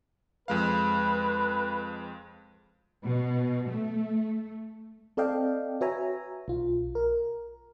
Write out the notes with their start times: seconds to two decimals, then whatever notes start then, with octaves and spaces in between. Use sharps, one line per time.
0.48 F2 G#3 B4 F5
3.02 B2
3.70 A3
5.17 C4 A4 D5 D#5 F5 G5
5.81 F#4 B4 C#5 E5 G#5 A#5
6.48 B1 F4
6.95 A#4